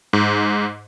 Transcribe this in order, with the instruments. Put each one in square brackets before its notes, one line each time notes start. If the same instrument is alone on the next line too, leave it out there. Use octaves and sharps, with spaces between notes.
[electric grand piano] G#2